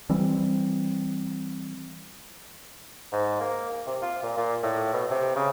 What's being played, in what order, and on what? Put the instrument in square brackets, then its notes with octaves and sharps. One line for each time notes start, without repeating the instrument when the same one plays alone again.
[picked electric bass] E3 G3 C4
[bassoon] G#2
A#3
C3
F4
A#2
A#2
A2
B2
C3
C#3